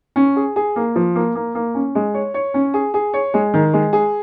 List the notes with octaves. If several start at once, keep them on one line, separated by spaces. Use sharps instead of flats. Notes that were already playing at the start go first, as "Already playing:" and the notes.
C#4
G#4
G#4
A#3
F3
A#3
A#3
A#3
C#4
G#3
C#5
C#5
C#4
G#4
G#4
C#5
G#3
D#3
G#3
G#4